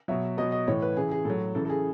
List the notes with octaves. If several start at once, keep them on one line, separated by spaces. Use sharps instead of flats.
B2 F#3 E5
B2 F#3 D#5
D#5
A2 E3 C#5
B4
C#3 E3 G#4
G#4
A2 F#3 A4
C#3 E3 A4
A4
G#4